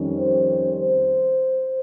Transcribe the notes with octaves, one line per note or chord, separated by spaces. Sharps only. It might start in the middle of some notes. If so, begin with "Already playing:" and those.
Already playing: F2 D#3 G3 C#4
C5
C5